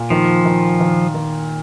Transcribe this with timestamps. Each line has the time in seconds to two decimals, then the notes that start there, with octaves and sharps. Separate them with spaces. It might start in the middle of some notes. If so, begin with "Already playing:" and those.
Already playing: A#2
0.10 D#3 F3
0.45 D#3
0.80 D#3
1.14 D#3